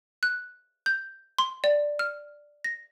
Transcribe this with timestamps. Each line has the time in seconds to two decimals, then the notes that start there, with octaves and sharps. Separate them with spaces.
0.23 F#6
0.86 G6
1.38 C6
1.64 D5
1.99 F6
2.64 A#6